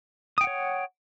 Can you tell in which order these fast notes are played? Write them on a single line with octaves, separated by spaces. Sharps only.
D#6 G5 F#5 C#5